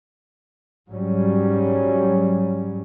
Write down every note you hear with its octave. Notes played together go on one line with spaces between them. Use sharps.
G#2 F#3 G3 C#4